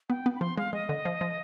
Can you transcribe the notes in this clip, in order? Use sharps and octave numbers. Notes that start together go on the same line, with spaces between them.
B3 G5
B3
B5
F3 C6
G#3 F5
G#3 D#5
D3
F3
F3